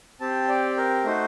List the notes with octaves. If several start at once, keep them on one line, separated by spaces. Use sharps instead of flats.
C4 G4 A5
D5
A#4
A3 D#4 F#4 C5